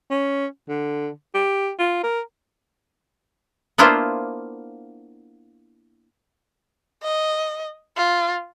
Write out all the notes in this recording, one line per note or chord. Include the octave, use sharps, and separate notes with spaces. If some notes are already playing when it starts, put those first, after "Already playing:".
C#4
D3
G4
F4
A#4
A#3 B3 D4 E4 F4 C5
D#5
F4